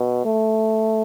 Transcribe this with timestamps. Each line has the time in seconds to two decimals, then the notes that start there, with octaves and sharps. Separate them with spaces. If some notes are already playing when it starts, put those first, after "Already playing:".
Already playing: B2
0.25 A3